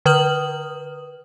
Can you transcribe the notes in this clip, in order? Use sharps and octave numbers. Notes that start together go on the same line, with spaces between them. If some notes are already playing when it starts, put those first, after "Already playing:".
D3 B4 D#6 F6 F#7